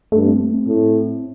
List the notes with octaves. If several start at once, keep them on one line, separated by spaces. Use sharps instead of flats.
G2 A3
C4
A3
C4
A2